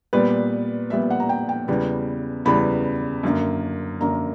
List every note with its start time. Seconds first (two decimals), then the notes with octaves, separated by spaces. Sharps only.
0.13 A#2 G3 B3 B4
0.90 A#2 G3 B3 E5
1.10 F#5
1.20 A#5
1.29 G5
1.49 G5
1.68 E2 C#3 G3 B3
2.45 E2 C#3 G3 B3 B5
3.23 F#2 D3 A#3
4.01 F#2 D3 A#3 A#5